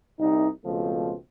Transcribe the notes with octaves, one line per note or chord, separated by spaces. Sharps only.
C2 D#4
C#2 B2 F3 A3 C4